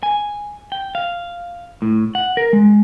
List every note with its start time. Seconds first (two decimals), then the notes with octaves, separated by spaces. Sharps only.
0.03 G#5
0.72 G5
0.95 F5
1.82 A2
2.15 F#5
2.37 A#4
2.53 G#3